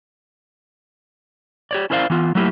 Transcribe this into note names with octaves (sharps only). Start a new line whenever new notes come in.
G4 C#5 D5
C#4 E4 A#4 C5 D5 F5
E3 B3 F4
F#3 A3 A#3 E4 G4